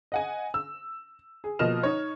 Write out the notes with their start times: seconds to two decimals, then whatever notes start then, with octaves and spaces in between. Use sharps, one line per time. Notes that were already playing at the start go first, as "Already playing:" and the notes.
0.12 D#5 F#5 G#5
0.54 E6
1.44 G#4
1.59 B2 F3 A#3 D#5 F6 E7
1.83 D#4 C#5